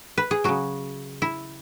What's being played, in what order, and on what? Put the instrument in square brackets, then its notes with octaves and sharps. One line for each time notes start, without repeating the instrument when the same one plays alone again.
[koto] B4
G#4
C#3 F#3 F#4
E4